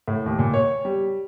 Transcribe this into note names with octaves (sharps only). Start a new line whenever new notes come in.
A2
D#2
A#2
C#5
G3